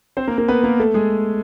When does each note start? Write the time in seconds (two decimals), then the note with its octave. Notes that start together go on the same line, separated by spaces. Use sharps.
0.17 C4 C5
0.27 A#3 A#4
0.38 A#3 A#4
0.48 B3 B4
0.64 A#3 A#4
0.80 A3 A4
0.94 G#3 G#4